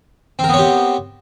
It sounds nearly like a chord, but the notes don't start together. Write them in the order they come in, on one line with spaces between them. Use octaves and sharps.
C4 A#4 B3 C#5 G4